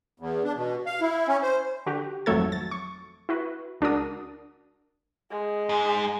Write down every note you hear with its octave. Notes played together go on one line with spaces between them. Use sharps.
E2
D4
B2
F5
E4
C#4
C5
D3 F#4 G4
G#1 F2 F#3 A3 A4 G#6
A6
C#6
E4 F#4 B4
C#2 D4 F#4 A#4 D#6
G#3
G#2